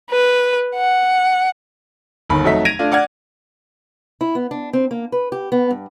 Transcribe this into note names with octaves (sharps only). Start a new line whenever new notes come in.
B4
F#5
G1 D#2 D#3 B5
F2 F#3 A3 D#4 E5 B6
G#6 A#6 D7 D#7 F7
A3 D4 F4
D5 F#5 F6 G#6
E4
B3
D4
C4
A#3
B4
G4
B3
G2